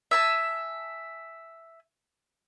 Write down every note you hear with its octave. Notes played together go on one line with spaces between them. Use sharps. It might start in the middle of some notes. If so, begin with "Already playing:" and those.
E5 G#5 A5